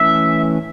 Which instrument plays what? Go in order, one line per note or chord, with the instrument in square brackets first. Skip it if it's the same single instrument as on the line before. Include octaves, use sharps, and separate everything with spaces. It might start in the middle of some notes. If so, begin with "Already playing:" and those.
Already playing: [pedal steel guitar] E3 A3 C#4 E5